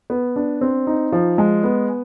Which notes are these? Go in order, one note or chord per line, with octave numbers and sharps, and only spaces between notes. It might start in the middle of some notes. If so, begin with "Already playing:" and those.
B3
D4
C4
D#4
F3
G#3
B3